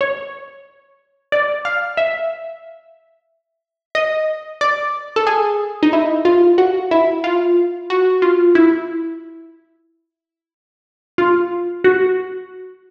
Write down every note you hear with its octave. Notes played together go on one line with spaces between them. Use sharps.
C#5
D5
F5
E5
D#5
D5
A4
G#4
D#4
E4
F4
F#4
E4
F4
F#4
F4
E4
F4
F#4